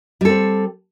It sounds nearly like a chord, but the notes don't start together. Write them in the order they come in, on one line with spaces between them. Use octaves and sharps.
G3 A4 C4